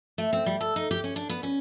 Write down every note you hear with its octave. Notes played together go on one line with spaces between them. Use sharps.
A3
C4
G3
A4
D#4
G4
C#4
D4
B3
C#4